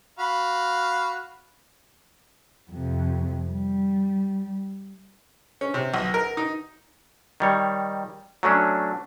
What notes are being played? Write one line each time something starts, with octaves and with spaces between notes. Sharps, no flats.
F#4 F5 B5
F2 C3
G3
C#4
C3
B1
A#4
D#4
D#3 G3 C#5
F#3 A3 C#4 D4